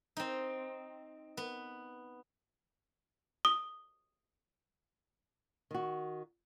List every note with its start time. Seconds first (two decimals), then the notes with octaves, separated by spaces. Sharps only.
0.17 C4 D#4
1.37 B3
3.45 D#6 G7
5.71 D#3 F#4